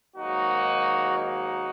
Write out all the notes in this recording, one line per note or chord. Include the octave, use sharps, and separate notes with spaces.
G#2 D#3 F#3 A#3 D#4 F#4
D#4 F#4